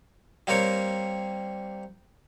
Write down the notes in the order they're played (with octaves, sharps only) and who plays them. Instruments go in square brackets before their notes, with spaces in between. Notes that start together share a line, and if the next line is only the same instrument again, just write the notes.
[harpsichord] G3 A#3 C4 A#4 C#5